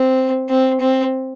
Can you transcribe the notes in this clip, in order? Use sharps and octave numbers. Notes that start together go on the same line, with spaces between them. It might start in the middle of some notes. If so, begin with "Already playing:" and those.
Already playing: C4
C4
C4